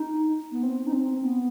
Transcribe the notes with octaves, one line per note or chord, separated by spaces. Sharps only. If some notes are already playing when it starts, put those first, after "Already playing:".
Already playing: D#4
B3
C4
D#4
C4
B3